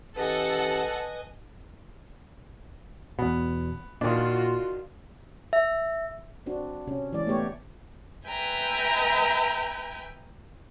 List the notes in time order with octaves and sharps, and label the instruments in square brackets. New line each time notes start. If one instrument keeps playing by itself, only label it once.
[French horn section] E3 C#4 G4 [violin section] A4 F#5 [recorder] B4 [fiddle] D#5 G#5
[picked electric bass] E2 B2 [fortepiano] B3
[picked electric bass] A#2 [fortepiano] D#3 D4 [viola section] F4 F#4
[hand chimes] E5
[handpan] C4 D4 F#4
C3 C#4
E3 G#3 D5
A3 B3 G4 C#5
[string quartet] B4 E5 G5 G#5 A#5